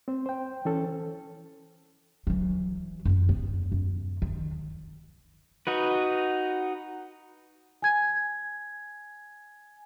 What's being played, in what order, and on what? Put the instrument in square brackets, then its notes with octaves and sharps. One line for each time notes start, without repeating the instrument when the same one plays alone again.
[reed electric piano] C4 C5
C5 G5
E3 C#4 A4
[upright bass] E3 F#3
F#2 F4
B3
F#2
D#3
[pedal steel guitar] D#4 F#4 B4
[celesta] G#5 G#6